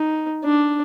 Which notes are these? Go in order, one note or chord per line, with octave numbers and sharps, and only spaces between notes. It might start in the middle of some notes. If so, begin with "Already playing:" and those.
Already playing: D#4
D4